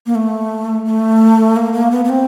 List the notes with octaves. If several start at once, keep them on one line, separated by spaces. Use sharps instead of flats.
A#3
A3
A3
A#3
A#3
B3
B3
C4